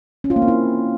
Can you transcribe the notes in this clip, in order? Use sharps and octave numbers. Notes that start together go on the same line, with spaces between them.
C#4
F4
A#3
C4
E4